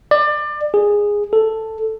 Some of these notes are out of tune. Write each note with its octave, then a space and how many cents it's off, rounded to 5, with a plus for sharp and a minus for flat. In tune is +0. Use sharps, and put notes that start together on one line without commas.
D5 +25
G#4 -10
A4 +5